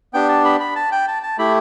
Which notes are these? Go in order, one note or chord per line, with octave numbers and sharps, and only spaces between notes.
B3 D4 G4 G5
A5
B5
B5
A5
G5
A5
A5
A3 E4 G4 B5